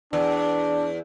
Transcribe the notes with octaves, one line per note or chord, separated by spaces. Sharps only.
E2 D4